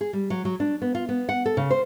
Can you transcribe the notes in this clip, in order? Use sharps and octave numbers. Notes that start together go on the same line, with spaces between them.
G#4
G3
F#3
F#3
D4
B3
F4
B3
F#5
A4
C#3
C5